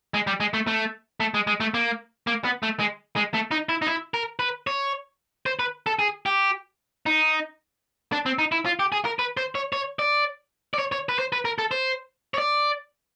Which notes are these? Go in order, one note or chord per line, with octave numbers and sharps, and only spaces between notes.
G#3
G3
G#3
A3
A3
A3
G#3
G#3
A3
A#3
A#3
B3
A3
G#3
G#3
A3
D#4
E4
D#4
E4
A#4
B4
C#5
C5
B4
A4
G#4
G4
D#4
D4
C4
D#4
E4
F4
G4
G#4
A#4
B4
C5
C#5
C#5
D5
D5
C#5
C#5
B4
C5
B4
A#4
A4
C5
C#5
D5